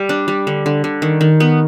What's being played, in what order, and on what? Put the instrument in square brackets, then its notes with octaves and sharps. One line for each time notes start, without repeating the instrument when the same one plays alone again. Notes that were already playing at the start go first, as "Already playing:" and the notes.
Already playing: [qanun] G3
D4
G3
D3
D3
D3
D#3
D#3
B3